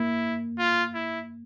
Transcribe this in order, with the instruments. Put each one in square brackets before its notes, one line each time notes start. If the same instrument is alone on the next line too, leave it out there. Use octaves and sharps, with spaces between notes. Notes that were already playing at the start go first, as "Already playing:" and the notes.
Already playing: [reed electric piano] A#3 [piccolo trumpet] E4
[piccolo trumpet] F4
E4